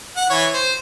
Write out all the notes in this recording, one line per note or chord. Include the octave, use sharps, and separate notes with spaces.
F#5
E3 C#5
C5